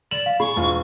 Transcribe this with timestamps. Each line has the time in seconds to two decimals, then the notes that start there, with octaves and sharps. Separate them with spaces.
0.11 D5 E7 F#7
0.26 F5
0.40 G#4 B5 C#6
0.56 E1 F4